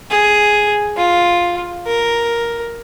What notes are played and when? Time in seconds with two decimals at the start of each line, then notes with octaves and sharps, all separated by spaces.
0.10 G#4
0.97 F4
1.86 A#4